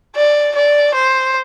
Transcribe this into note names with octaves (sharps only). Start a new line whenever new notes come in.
D5
D5
C5